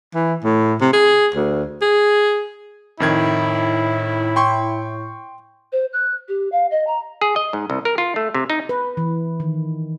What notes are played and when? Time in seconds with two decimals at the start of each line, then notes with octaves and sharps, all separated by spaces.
0.14 E3
0.44 A2
0.81 C3
0.93 G#4
1.35 D2
1.81 G#4
3.00 F2 A2 D#3 E4 G#6
4.36 G5 C6 C#6
5.72 C5
5.93 F#6
6.28 G4
6.52 F5
6.71 D#5
6.87 A#5
7.21 G#4
7.36 D#5
7.53 G#2
7.70 C2
7.85 A#4
7.98 F4
8.16 A3
8.34 C3
8.50 D#4
8.69 B4
8.97 E3
9.40 D#3